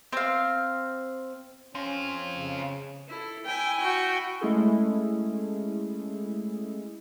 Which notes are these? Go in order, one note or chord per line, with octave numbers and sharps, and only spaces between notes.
C4 F5
C4 C#4 F4
C#3
E4 A4
E4 G5 G#5
F#4 G5
G#3 A3 C#4 E4 G#4 A4